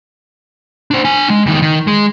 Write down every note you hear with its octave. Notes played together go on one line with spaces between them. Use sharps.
D4 C5
D4 G#5
G#3
E2 D#3
D#3
G#3